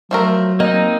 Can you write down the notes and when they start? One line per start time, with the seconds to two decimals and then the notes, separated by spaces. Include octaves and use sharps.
0.11 F3 F#3 A3 A#4
0.60 A#3 C4 D#4 D#5